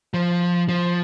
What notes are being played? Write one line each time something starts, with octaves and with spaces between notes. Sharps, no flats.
F3
F3